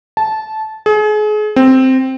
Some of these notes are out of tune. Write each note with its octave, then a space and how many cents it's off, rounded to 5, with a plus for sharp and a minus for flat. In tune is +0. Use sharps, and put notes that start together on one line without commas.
A5 -15
G#4 +35
C4 +0